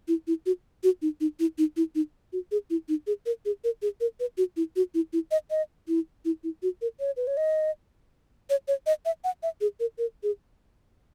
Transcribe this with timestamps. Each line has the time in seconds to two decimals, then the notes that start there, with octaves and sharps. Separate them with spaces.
0.08 E4
0.27 E4
0.46 F#4
0.83 F#4
1.02 D#4
1.21 D#4
1.40 E4
1.58 D#4
1.77 E4
1.95 D#4
2.33 F#4
2.51 G#4
2.70 E4
2.89 D#4
3.07 G#4
3.26 A#4
3.45 G#4
3.64 A#4
3.82 G#4
4.01 A#4
4.20 B4
4.38 F#4
4.57 E4
4.76 F#4
4.94 E4
5.13 E4
5.31 D#5
5.51 D#5
5.88 E4
6.25 E4
6.44 E4
6.63 F#4
6.82 A#4
7.00 C#5
7.17 B4
7.27 C#5
7.37 D#5
8.50 C#5
8.68 C#5
8.86 D#5
9.05 E5
9.24 F#5
9.43 E5
9.61 G#4
9.80 A#4
9.98 A#4
10.23 G#4